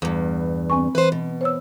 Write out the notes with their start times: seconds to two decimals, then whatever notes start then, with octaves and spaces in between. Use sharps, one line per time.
0.02 E2 G2
0.70 C4 G#5 C#6
0.95 E3 B4 C5
1.12 B2
1.41 C5 C#5 E6